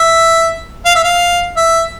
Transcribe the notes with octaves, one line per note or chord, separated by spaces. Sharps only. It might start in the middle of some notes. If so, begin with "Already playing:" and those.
Already playing: E5
F5
E5
F5
E5